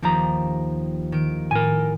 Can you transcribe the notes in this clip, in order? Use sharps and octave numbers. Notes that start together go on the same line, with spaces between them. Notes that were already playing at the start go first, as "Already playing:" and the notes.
D#2 F3 D#4 G4 A#5
D#3 D7
A2 A#4 G#5